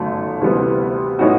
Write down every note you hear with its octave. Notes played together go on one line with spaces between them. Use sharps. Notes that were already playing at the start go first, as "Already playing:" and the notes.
Already playing: G1 F#2 D#3 F#3 A3
D2 C3 E3 G3 B3
A2 F#3 B3 D#4 F#4